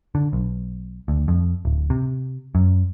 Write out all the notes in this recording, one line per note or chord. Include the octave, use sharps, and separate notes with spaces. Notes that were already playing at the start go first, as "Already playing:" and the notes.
D3
B1
D2
F2
D1
C3
F#2